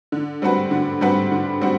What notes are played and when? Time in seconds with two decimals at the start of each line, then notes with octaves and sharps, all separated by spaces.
0.12 D3
0.42 G3 C4 F#4 B4
0.71 D3
1.01 G3 C4 F#4 B4
1.32 D3
1.61 G3 C4 F#4